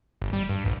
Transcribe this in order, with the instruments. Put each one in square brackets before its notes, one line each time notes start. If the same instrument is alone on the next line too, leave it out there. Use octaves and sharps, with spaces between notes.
[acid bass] G1
G3
G2
A#1